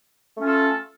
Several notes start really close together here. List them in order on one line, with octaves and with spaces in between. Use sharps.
A3 C#4 F4 A4